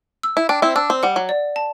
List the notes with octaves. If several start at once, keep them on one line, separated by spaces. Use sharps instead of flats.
E6
E4
D4 G5
C4 E4
D4 E6
C4
G3 F#5
F#3
D5
A5